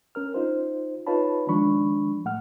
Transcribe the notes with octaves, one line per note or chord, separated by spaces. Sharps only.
C#4 A#4 F6
D#4 F4 C5
D#4 F4 B4 C#5 A5 B5
D#3 F3 G#3 D4 B5 C#6
A2 A3 F#5 F6